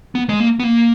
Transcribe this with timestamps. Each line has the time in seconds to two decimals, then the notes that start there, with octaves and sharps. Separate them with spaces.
0.15 B3
0.29 G#3
0.40 A#3
0.60 B3
0.64 A#3